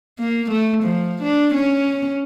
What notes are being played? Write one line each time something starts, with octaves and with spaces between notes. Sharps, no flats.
A#3
A3
F3
D4
C#4